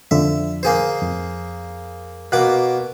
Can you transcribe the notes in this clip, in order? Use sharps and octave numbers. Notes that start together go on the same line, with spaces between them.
F2 D3 F3 E5
A#3 G#4 C5
F2
B2 A#3 D6 F#6